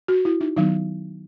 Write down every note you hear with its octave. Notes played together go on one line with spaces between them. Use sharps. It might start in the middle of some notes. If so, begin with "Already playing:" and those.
F#4
E4
D#4
D#3 F#3 B3 D#4